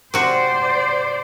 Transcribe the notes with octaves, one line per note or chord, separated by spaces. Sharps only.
C3 F#4 C5 D5